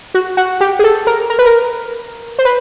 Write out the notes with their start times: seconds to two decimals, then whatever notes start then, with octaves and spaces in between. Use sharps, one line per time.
0.14 F#4
0.37 F#4
0.61 G4
0.79 G#4
0.84 A4
1.07 A#4
1.30 A#4
1.39 B4
1.46 A#4
2.39 C5
2.45 B4